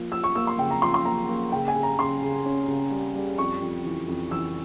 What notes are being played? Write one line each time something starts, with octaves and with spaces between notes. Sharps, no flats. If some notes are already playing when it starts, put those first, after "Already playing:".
Already playing: F3 A#3
F3 E6
C#6
A#3 E6
C6
C#3 G5
A#5
F3 C6
C6
A#3 A#5
A#3
C#3 G5
G#5
C#3
A#5
C#3 C6
C#3
C#4
C#3
G3
G3
F2 C#6
F2
E3
F2
E3 E6